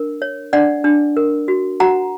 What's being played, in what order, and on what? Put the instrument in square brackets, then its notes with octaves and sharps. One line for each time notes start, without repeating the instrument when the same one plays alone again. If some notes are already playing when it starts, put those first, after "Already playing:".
Already playing: [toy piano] D4 A#4
C#5
D4 D5 F#5
D4
A#4
F#4
F#4 F#5 A#5